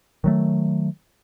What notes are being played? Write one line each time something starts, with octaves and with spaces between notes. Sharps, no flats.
D#3 F#3 A3